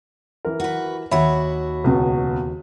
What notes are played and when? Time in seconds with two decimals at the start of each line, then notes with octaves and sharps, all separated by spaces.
0.45 E3 A#4
0.60 F#4 B4
1.11 D#2 F#4 C#5 E5 B5
1.84 C#2 B2